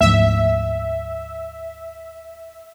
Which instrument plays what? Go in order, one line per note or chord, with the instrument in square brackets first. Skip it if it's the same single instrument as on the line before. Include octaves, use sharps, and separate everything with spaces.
[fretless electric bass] D2 G#2 F3 [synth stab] E5